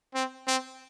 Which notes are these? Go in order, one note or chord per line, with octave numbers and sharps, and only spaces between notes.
C4
C4